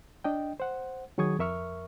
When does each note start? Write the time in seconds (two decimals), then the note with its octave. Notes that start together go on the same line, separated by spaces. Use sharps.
0.24 D4 D#5 G5
0.60 C5 F#5
1.18 D#3 F#3 G#4 C#6 D#6 G#6
1.39 F2 A#4 E5 C#6 F6